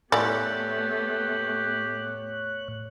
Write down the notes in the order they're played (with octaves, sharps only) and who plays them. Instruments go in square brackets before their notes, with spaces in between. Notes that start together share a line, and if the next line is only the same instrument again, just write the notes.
[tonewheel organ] A2 C#5 F#6 [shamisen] E3 D5 [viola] A3 B3 [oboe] G4